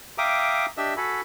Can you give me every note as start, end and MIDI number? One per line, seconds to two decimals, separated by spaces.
0.18 0.66 76
0.18 0.66 77
0.18 0.66 79
0.18 0.66 82
0.18 0.66 86
0.18 0.66 87
0.77 0.94 62
0.77 0.94 67
0.77 0.94 75
0.77 0.94 76
0.77 0.94 88
0.97 1.21 66
0.97 1.21 69
0.97 1.21 80
0.97 1.21 83